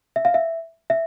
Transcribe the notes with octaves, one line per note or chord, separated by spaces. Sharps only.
E5
F5
E5
E5